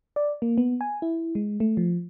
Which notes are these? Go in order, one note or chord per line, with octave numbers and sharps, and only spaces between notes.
D5
A#3
B3
G#5
E4
G#3
A3
F3